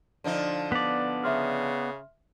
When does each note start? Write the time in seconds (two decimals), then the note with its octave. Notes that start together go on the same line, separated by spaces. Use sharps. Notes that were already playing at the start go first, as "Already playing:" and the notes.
0.24 D3 F3 D#4
0.72 B3 D5 B6
1.23 C#3 E5 C6 F6